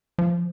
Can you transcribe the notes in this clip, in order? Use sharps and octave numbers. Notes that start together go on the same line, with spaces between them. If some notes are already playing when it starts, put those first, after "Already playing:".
F3